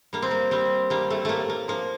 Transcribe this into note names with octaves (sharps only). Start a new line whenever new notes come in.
G3 A#3
C4
A#3
G3 C4
G3 A#3
A3
A2 A3 A#3
A#3
F3 A#3